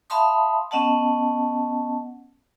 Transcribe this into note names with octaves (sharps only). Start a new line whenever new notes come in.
E5 F5 A5 B5 C6 D#6
B3 C#4 D#5 F#5 A5